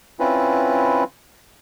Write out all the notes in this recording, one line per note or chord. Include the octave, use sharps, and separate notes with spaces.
C4 C#4 E4 F4 B4